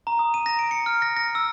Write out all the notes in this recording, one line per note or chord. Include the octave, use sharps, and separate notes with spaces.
A#5
D#6
D#7
A#6
D7
C#7
F6
A#6
A#6
E6